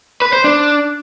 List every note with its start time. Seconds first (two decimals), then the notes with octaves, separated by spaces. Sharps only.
0.22 B4
0.33 C5
0.44 D4